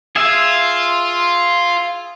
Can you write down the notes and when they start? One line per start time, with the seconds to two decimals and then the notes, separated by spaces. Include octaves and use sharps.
0.16 F4 G#4 E5